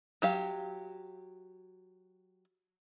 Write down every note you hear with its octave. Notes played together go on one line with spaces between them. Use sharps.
F#3 G4 F5